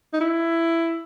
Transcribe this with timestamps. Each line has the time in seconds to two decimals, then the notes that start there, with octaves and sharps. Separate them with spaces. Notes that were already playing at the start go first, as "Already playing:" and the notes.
0.13 D#4
0.21 E4